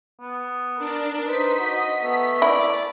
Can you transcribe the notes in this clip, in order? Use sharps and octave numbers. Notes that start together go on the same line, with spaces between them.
B3
D4 A#4
D#4 B4 C5 B6
F#4 D#5
A3 B3
E4 D5